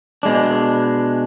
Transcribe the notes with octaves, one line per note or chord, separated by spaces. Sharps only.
B2 G#3 D4